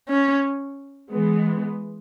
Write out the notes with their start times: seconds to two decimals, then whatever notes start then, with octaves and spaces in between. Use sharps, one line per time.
0.08 C#4
1.11 E3 G#3 B3